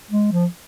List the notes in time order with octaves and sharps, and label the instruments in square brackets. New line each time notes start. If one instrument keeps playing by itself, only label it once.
[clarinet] G#3
F3